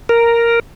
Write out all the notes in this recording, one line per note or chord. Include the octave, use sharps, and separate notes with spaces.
A#4